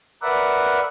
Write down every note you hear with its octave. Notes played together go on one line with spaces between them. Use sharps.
A#4 B4 D5 E5 F#5